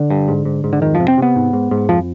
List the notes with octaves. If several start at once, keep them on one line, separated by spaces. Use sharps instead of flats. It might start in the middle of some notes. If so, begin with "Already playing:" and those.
Already playing: D3
G2
G#2
G#2
G#2
D3
F2 D#3
F3
C3
C4
C3 B3
G#2
G#2
G#2
F2 F3